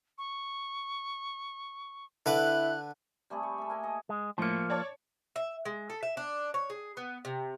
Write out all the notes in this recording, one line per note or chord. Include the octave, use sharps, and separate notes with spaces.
C#6
D3 E4 B4 D6 F#6
G3 A3 C4 G#4
C#6
A4 E5
A#3 G#5
A4 D#5
G#3
A2 F3 A#3 C#7
C#5 D5 A5
E5
G#3
A4
E5
D4
C#5
G#4
B3
C3